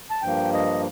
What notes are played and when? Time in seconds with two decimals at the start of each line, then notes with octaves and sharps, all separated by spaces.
0.11 A5
0.22 G2 F3 A#3 G5
0.53 D#5